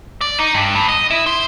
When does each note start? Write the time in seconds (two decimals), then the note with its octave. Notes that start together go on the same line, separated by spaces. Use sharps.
0.21 D5
0.39 D#4
0.54 G2
0.76 G2
0.89 D#5
1.10 E4
1.26 C5